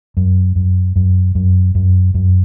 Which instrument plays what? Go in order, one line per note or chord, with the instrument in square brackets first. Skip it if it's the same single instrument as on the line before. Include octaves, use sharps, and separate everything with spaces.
[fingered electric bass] F#2
F#2
F#2
F#2
F#2
F#2